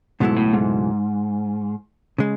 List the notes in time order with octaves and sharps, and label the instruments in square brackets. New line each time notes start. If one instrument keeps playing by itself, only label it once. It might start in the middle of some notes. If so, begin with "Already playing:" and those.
[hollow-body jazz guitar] C#2 B2 F#3 A3 E4 [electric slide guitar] G#2
[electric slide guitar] A2
G#2
[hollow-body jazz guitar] C#3 G#3